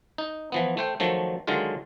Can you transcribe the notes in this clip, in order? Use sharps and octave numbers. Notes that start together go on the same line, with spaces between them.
D#4
E3 F3 B3
A3 C5 G5
D#3 F3 F#3 A3
D3 D#3 F#3 G#3 F4